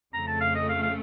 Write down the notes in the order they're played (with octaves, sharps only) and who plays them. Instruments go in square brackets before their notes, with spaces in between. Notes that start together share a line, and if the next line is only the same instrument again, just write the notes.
[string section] F2 C#3 A3 [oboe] A#5
[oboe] A5
F5
D#5
F5
F5